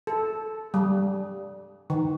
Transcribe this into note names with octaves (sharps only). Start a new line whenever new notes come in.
A4
G3
D#3